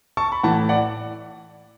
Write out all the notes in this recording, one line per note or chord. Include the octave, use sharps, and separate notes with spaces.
A5 C#6
B5
A2 E3 F#5 A5
D5 F#5